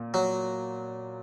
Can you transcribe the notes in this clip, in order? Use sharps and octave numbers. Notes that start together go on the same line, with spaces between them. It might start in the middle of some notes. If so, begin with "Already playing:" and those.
Already playing: A#2
F#3